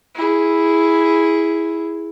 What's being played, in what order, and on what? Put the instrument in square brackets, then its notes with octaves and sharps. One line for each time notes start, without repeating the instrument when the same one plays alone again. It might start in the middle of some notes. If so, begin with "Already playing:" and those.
[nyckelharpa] E4 G#4